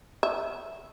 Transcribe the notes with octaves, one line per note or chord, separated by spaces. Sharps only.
E5